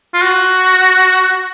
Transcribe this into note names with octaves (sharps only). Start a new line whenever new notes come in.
F4
F#4